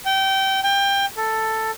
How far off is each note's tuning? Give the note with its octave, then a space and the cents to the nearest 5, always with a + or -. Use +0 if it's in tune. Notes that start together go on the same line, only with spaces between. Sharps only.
G5 -25
G5 +20
A4 +5